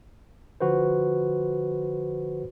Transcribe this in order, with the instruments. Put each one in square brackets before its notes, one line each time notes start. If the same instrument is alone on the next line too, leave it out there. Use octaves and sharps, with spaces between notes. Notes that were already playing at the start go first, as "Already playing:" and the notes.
[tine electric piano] D3 F3 F#4 B4 C5